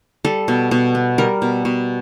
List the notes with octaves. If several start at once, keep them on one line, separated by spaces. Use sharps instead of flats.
G3 A4
B2
B2
B3
G3 A#4
B2
B2